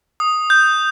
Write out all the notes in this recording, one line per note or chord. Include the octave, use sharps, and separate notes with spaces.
D#6
G6